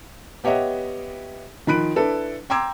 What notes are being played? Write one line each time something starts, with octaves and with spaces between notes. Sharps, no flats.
B3 G4 C#5 D#5 E5 F#5
D#3 F3 B5 F#6 D7
D4 E4 A4 B4
G5 A#5 C6 D6 E6 G#6